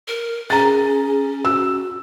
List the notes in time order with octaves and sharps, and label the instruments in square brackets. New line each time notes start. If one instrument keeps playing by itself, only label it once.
[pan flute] A#4
[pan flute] C#4 [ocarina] G#4 [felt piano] A#5 A6
[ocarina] F#4 [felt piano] E6